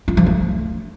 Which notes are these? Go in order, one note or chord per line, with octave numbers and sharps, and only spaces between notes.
F4
F3
A3